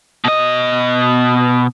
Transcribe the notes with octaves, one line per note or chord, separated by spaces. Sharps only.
B2 D#5